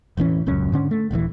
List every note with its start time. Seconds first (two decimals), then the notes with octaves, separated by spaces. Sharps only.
0.17 E1 A1 E3 C#4
0.46 D#1 C#2 F#2 C#4
0.72 G#2 D3 C#4
0.91 A3
1.11 D#1 A#1 C3 E3